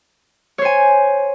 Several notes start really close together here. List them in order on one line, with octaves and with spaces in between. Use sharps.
C#5 C5 G#5